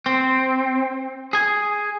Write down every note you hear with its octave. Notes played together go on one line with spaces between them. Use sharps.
C4
G#4 G#5